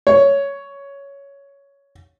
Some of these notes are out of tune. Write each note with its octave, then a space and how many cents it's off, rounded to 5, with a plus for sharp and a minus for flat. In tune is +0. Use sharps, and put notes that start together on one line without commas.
C#5 +10